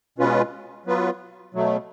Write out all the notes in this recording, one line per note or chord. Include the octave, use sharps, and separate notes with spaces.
B2 G#3 C#4 F4 B4
F#3 B3 F4 B4
B2 F#3 A3